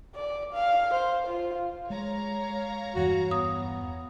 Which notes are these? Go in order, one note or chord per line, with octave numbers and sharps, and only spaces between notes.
D5
F5
C5
F4
G#3 C#5 F5 A#5
E2 G2 E3 F#4
B3 D#6